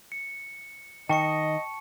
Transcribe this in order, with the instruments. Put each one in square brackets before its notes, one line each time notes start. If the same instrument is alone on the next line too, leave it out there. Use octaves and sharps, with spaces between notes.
[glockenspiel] C#7
[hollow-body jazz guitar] D#3 [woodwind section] D#5 [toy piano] G5 [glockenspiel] A5 C#6 C#7